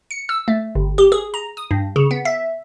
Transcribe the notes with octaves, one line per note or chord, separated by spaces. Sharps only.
C#7
E6
A3
G1
G4
G#4
A#5
D#6
G2
C#3
B3
E5